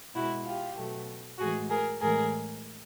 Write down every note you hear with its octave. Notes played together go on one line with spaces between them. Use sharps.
B2 G#3 E4 F#4
F4 G4
B2 F#3 A3
A2 E3 G#3 F#4 G#4
G#4 A#4
A2 E3 G#3 G#4 A#4